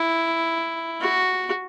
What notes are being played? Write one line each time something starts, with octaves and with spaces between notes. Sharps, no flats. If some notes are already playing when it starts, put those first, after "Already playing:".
Already playing: E4
F#4